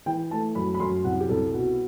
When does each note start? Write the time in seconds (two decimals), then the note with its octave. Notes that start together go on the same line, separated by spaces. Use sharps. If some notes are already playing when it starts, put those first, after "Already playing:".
0.06 E3 G5
0.31 A3 A5
0.55 F#2 B5
0.74 B5
0.80 F#2 C6
1.05 C2 F#5
1.20 G4
1.29 C2 A4
1.54 B2